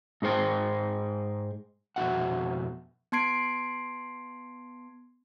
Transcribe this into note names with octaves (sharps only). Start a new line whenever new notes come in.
G#2 D#4 G#4 C5 G5
F2 B2 D#4 F#4 E5 F#5
B3 A5 C6 G#6 C7 D7